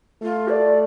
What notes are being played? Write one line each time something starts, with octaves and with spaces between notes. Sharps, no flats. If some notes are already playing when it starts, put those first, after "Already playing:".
A3 F4
D5